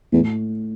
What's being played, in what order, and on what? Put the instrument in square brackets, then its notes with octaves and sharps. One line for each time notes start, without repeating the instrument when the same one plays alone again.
[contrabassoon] E2 [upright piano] A2